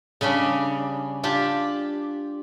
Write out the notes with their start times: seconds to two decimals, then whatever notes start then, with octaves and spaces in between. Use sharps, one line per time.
0.21 C#3 G3 C#4 D4
1.23 D4 F4 G4